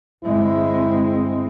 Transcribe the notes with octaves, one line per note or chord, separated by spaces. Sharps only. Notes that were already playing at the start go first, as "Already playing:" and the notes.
G1 G#3 C4 E4